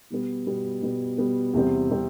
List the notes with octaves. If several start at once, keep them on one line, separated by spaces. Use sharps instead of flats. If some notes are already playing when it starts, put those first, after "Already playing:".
B2 G3 B3
B2 G3 B3
B2 G3 B3
B2 G3 B3
E2 C3 G3 C4
C3 G3 C4